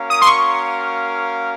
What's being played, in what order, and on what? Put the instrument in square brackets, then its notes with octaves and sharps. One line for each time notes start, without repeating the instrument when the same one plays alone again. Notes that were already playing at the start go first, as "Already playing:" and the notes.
Already playing: [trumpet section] A#3 C#4 F#4 A#4 F5
[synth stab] D#6
C6
C#6